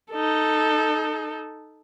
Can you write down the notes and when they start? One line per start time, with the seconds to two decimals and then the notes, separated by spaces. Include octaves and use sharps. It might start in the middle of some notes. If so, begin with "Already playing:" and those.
0.12 D#4 A4